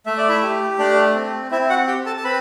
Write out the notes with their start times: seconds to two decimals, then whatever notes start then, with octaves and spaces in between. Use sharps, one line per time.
0.06 A3 E5
0.17 D5
0.29 E4 E5
0.42 G4
0.79 A3 D4 D5
1.15 C4
1.51 C4 E4 E5
1.70 F#4 F#5
1.87 G4 G5
2.06 A4 A5
2.17 A5
2.24 C4 B4 B5